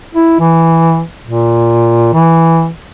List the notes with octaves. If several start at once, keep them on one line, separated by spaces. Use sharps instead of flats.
E4
E3
A#2
E3